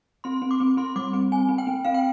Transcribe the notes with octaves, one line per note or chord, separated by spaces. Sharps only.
C4 C6
C4
D6
C4
C4 C6
G3 D6
C4
C4 G#5
C4
G5
C4
C4 F5
G5